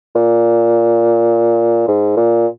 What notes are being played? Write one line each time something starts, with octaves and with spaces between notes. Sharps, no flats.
A#2
G#2
A#2